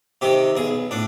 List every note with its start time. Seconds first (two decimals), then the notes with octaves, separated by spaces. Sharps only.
0.21 C3 D#3 G4
0.56 B1 G#4
0.91 A2 D4